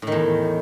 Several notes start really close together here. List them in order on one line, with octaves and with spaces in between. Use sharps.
A2 D#3 E2